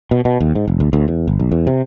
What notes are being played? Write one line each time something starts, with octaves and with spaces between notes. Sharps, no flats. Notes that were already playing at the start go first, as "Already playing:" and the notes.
B2
B2
D#2
G#2
F1
D2
D2
E2
G1
B1
E2
C3